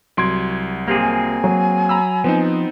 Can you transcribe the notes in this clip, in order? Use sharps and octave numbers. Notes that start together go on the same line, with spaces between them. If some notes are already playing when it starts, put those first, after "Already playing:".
C2 F#3 C6 G#6 D7
A#3 C4 G4 G#4
G#5
F#3
A#5 B5 E6
F3 B3 C4 D#4